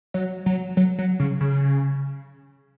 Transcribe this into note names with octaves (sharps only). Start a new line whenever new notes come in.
F#3
F#3
F#3
F#3
C#3
C#3